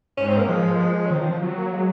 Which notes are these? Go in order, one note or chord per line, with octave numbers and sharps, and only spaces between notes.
G#2 C#4
C4
A#3
F3 G#3
A#3
G#3
C#4
D#3 C4
F3
F3
F#3
A#3
G#3